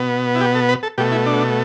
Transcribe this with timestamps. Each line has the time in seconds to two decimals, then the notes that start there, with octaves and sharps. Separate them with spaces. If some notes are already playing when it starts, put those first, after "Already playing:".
Already playing: B2 B3
0.35 E4
0.41 G4
0.55 A4
0.69 B4
0.83 A4
0.98 B2 A3 G4
1.12 E4
1.26 D4